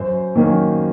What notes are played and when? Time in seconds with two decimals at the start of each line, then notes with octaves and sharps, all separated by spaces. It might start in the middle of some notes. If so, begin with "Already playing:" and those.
Already playing: F#2 C5
0.36 D#3 F#3 A#3 C#4